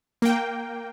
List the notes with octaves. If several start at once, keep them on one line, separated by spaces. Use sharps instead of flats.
A#3 G5